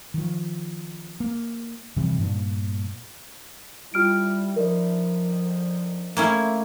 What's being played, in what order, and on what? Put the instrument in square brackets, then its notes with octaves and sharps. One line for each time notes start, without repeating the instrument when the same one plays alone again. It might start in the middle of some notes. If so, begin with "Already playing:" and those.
[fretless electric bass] D#3 F3
A#3
F2 C3 E3 G3
G2 A#2
[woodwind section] G3 [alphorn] E4 [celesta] F4 F6 D7
[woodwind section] D3 D#3 F3 [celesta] A#4 D5
[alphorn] A3 [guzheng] A#3 C#4 E4